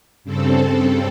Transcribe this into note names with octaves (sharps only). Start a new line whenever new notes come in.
G2 C#3 C4 A4